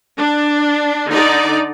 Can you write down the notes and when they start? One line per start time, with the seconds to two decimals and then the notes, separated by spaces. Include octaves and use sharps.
0.18 D4
1.09 D3 D#4 D5